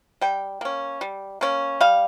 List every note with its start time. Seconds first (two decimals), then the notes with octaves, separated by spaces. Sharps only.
0.21 G3 G5
0.61 A#3 C#4
1.01 G3
1.41 A#3 C#4
1.81 G3 F5